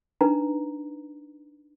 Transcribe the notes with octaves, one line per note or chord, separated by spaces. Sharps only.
D4 D#4 B4 A#5